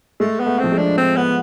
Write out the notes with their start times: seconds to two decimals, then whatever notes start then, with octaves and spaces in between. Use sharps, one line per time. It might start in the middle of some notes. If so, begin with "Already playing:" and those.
0.20 G#3 A3
0.40 B3
0.46 A3
0.59 F3 C4
0.72 G#3
0.78 D4
0.98 C4
1.17 B3